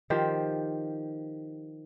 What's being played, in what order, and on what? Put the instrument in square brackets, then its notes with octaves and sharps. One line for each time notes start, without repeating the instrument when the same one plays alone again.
[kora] D#3 F3 G4 C5